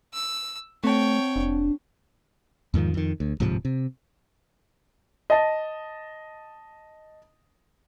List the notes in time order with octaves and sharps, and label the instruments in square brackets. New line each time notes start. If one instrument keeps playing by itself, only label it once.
[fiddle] E6
[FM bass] A3 [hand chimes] C4 A5 [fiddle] C#5 G5
[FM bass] F1 [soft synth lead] D4
[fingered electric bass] E2 G#2 D#3 F3
F2 D#3
D2
D1 G#2 C3 F3
C3
[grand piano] D#5 A5